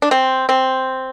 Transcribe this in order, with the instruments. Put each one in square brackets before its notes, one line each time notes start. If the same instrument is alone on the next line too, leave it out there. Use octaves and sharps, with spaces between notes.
[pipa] D4
C4
C4